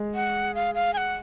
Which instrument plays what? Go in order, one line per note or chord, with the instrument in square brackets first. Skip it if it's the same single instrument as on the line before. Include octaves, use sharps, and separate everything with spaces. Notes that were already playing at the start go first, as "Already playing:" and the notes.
Already playing: [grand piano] G#3 G#4
[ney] F#5
F5
F5
G#5
F#5